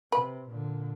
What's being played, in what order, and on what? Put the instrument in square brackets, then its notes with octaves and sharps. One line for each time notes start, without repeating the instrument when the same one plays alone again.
[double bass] C3 [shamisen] B4
[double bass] A#2 D3